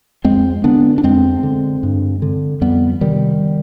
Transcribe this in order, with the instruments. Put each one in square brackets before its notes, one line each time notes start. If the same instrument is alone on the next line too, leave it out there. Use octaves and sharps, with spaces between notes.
[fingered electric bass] F2 G#3 C4
D3 B3 D4
D4
F2 G#3 C4
D3
G2
D3
F2 G3 B3
C3 D#3 G3